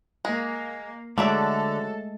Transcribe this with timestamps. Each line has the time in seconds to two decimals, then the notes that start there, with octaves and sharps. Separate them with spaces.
0.25 G#3 A#3
1.18 D3 F#3 G#3 A3 A4 D5 E5